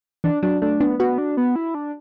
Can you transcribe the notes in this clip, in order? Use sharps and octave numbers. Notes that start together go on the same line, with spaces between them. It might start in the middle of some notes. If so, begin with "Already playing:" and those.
E3 D4
F#3 D4
A3 D4
B3 D4
B3 F#4
D4
B3
E4
D4